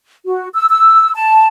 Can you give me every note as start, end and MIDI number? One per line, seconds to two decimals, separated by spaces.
0.25 0.49 66
0.54 0.67 88
0.70 1.12 88
1.14 1.46 81